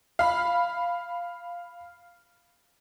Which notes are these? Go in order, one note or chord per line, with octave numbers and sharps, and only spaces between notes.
F5 B5